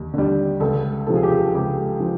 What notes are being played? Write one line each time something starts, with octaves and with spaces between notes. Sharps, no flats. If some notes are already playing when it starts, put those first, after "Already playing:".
Already playing: D#2 D3
D3 G3
C#2 A4
C3 F3 A4
G#4
G4
G#4
C#2 G4
F3